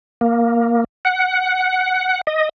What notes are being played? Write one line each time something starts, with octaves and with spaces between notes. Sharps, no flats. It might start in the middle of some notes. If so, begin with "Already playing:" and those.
A#3
F#5
D#5